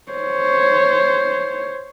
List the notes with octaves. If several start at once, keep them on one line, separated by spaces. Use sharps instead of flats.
C5 C#5